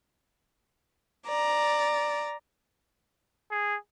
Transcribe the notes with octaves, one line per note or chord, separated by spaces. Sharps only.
D5 A#5
G#4